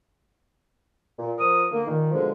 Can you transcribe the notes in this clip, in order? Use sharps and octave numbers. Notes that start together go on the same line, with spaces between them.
A#2
F3 A#4 D#6
D3 A#3
A#2 D#3
G#2 B2 D3 F3 G#3